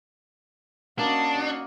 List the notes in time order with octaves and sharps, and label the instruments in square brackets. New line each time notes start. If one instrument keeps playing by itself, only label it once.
[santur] A#3 [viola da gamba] C#4 F#4 D#5 [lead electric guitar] D4